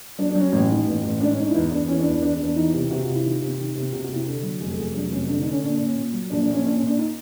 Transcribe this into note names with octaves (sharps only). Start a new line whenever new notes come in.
F#3 D4
D4
F#3
C#4
A1
D#3
A1
A1
G#2 D4
C#4
G#2 D#4
D4
E4
E2 D#4
E2 D4
E3 C#4
D4
E2
D4
E2 D4
D4
E2
D4
E3 D#4
C3
C3 F#4
C3 F4
E4
D#3 F4
C3
D#3
C3
C3 F#4
F#4
C3
E4
D3 A4
F#3
F1 G#4
A4
F1 G#4
F#3 D4
F1 C#4
D3 D4
D#4
D3
C#4
A#2 D4
D4
A#2
C#4
A#2
F#3
A#1 D4
D4
A#1
C#4
A#2 D4
C#4
A#2
D4
D#4